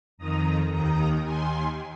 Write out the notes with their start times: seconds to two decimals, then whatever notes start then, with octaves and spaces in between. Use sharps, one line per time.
0.18 F2 D#3 A#5 D#6
0.70 D#2 D#3 A#5 D#6
1.24 D#2 D#3 G#5 C6